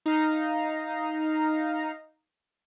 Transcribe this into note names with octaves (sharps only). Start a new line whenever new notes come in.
D#4 F5 A#5